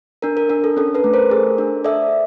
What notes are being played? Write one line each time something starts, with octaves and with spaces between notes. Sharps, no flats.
D4 A#4
A#4
D4 A#4
A4
C#4 A4
A4 B4
A3
A#4 C5
G#4
D4
A4 D5 E5